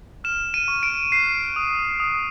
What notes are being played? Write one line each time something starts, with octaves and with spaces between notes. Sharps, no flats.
F6 E7
D#7
C#6
D7
F#6 C7
D#6
D#6